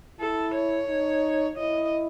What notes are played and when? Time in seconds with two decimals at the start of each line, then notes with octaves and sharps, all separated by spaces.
0.20 E4 A4
0.55 C#5
0.89 D#4
1.58 E4 D#5